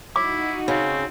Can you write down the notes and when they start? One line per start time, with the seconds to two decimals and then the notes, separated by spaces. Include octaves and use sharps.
0.16 D#4 E4 F#4 D6
0.68 C#3 C4